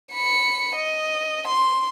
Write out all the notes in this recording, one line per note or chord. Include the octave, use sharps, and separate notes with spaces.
B5 C#7
D#5
C6